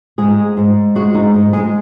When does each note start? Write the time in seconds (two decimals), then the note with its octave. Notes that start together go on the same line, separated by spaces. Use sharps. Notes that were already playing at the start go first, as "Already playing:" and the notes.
0.18 G#2 G#3 G#4
0.57 G#2
0.95 G#3 F#4
1.14 D#4
1.34 G#2
1.53 G#3 G#4